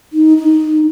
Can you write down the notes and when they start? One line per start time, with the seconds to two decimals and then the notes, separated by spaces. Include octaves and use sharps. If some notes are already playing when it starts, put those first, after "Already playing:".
0.12 D#4
0.37 D#4